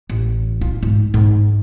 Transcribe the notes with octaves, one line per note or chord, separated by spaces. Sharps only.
A1
F4
G#2
G#2